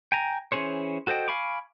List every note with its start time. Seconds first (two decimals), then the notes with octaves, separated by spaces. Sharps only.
0.12 G5 G#5 A#5
0.52 E3 C#4 G#4 C5 C#5
1.07 F#4 A4 C5 D#5 G5
1.28 F5 G#5 B5 C#6 D6